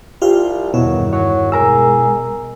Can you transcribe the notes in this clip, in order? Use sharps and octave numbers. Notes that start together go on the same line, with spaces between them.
C2 F4 G4 F5
E2 G2 B2 D#3 F#3 E4
F#3 C#5
B2 G#3 G#4 A#4 A#5 E6